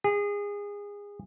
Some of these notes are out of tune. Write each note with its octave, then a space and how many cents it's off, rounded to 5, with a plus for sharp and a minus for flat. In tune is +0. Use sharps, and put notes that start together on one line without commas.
G#4 -25